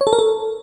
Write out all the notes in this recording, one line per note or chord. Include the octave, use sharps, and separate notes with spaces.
C#5
A4
A#4
A4